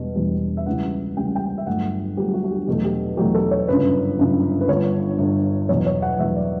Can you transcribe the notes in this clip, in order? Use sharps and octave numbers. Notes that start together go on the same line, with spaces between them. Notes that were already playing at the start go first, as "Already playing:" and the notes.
Already playing: E1 E2 B2 G3
E1 E2 B2 G3
E5
C#2 C#3 E3 G3 F#5
C#2 C#3 E3 G3 G5
G5
E5
G1 G2 F#3 A3 F#5
G1 G2 F#3 A3 G4
G4
F#4
F#4
G4
E2 B2 F#3 A3 G4
G4
E2 B2 F#3 A3 G4
A4
C#5
G1 F#2 C#3 B4
G1 F#2 C#3
B4
G1 G2 D3 C#5
G1 G2 D3
E2 B2 F#3 C#5
C#5
F#5
E2 B2 F#3 E5
D5